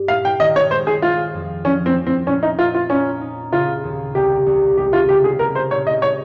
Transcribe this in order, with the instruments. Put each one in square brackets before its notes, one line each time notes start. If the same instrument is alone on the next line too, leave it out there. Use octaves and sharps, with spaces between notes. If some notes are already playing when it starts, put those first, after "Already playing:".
Already playing: [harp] G2
[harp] A#2 [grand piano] F5
[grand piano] G5
[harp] D#3 [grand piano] D#5
[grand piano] C#5
[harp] G#3 [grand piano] C5
[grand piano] G#4
[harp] G#3 [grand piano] F4
[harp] F2
[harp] F3 [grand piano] C#4
[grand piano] C4
[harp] F3
[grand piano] C4
[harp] A#2 [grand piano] C#4
[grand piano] D#4
[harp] A#2 [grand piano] F4
[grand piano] F4
[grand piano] C#4 [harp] D#4
[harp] D#4
[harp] C#3 [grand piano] F4
[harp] D#2
[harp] C2 [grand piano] G4
[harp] C2
[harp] G#3 [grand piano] G4
[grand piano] F4
[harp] C#3 [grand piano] G4
[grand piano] G#4
[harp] A#3 [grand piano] A#4
[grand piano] C5
[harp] A#2 [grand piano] C#5
[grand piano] D#5
[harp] G#3 [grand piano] C#5